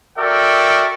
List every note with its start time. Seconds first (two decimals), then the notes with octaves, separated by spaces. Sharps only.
0.17 F#4 A4 A#4 D5 E5 G5